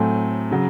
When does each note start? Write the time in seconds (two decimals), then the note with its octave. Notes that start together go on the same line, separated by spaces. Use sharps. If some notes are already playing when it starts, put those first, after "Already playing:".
Already playing: A2 F#3 A3 C4 G#5
0.51 C#3 F#3